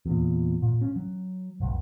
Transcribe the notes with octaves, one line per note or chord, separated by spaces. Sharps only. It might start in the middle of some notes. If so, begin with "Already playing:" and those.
E2 A#2
A#2
C#4
F#3
F1 B1